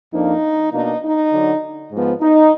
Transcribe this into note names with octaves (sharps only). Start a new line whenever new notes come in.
F2 F3 A#3 D4 D#4
B2 A#3 D4 D#4
D#4
D3 F#3 D4
G#2 F3 B3
D#4